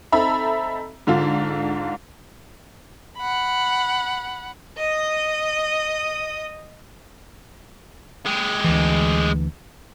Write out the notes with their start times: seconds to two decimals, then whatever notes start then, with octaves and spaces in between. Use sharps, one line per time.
0.12 C4 D#4 A4 E5 A#5 B5
1.07 G#2 D3 D4 F4
3.17 F#5 B5
4.77 D#5 D#6
8.26 G#3 G4
8.64 D2 E3